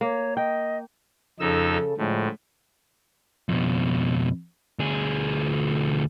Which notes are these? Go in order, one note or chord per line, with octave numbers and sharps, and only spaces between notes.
A#3 C#5
D#5 G5
F2 C#3 D#4 A4 E6
A2 D3 F3 G#3
F2 B2
D2 G#4